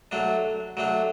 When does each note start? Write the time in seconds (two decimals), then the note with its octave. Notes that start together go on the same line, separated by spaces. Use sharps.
0.11 F#3 A3 D4
0.77 F#3 A3 D4